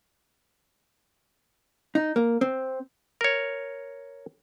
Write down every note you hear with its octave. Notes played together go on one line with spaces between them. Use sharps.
D#4
A#3
C4
A#4 C#5